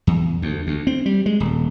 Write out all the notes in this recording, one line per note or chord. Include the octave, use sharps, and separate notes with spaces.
E2
D2
D2
C4
G3
G#3
D#1